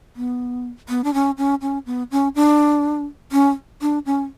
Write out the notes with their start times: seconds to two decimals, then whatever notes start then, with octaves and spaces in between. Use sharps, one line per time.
0.16 B3
0.89 B3
1.04 D4
1.14 C#4
1.38 C#4
1.61 C#4
1.86 B3
2.11 C#4
2.35 D4
3.32 C#4
3.82 D4
4.06 C#4